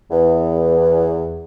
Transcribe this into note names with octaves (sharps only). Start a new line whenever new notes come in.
E2